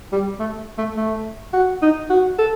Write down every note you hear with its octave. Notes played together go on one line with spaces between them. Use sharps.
G3
A3
A3
A3
F#4
D#4
F#4
A4